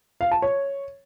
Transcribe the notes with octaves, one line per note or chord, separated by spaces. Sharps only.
F5
A5
C#5